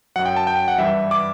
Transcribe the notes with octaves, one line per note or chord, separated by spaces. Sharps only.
F#2 F#3 F#5
G5
A5
G5
F#5
G2 E3 G3 E5
D6